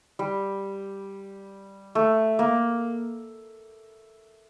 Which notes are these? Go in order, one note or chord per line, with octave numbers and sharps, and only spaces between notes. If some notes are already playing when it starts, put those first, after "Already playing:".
G3
A3
A#3